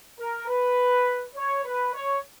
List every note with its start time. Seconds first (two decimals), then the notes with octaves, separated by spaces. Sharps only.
0.19 A#4
0.48 B4
1.36 C#5
1.64 B4
1.93 C#5